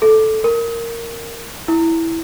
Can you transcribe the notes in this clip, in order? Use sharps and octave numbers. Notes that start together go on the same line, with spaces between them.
A4
A#4
E4